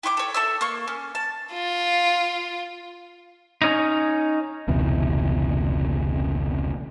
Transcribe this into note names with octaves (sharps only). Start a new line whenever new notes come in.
E4 G5 C#6 D6
A4 C#5
A4 E5 E6
A#3 C#6
C#4
A5
F4
C#4 D#4
F1 C#2 B2 E3